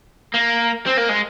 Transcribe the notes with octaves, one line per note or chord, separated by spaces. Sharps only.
A#3
C4
A#3
G#3